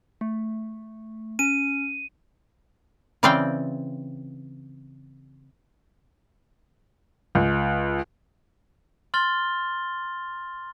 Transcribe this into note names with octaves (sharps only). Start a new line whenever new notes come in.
A3
C#4 D#7
C#3 E3 C4 D5 F5 G5
C#2
C6 F6 A6 G7